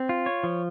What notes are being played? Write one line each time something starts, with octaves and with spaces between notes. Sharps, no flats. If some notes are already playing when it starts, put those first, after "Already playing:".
Already playing: C4
F4
C#5
F3